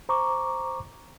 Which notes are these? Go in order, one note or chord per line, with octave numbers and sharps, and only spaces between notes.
C5 A#5 C#6 D6